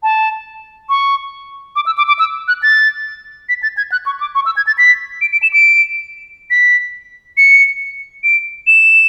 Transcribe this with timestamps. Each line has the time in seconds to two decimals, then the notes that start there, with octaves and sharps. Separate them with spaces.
0.03 A5
0.89 C#6
1.76 D6
1.86 E6
1.98 D6
2.08 D6
2.19 E6
2.48 F#6
2.63 A6
3.49 B6
3.63 A6
3.77 G#6
3.92 F#6
4.06 C#6
4.20 D6
4.35 C#6
4.46 E6
4.57 G#6
4.67 A6
4.78 B6
5.21 D7
5.32 D7
5.43 E7
5.53 D7
6.50 B6
7.37 C#7
8.24 D7
8.67 E7